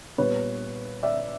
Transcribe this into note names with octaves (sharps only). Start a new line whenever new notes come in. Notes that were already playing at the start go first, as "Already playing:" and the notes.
A#2 G3 B3 B4 C#5
D5 E5